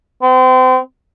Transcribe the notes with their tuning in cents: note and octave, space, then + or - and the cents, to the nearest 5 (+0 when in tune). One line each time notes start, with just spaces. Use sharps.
C4 -35